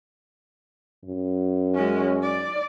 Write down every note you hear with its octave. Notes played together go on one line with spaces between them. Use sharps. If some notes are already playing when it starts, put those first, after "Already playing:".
F#2
G#3 C#4
D5